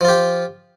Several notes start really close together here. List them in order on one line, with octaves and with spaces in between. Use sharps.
F3 F4 G4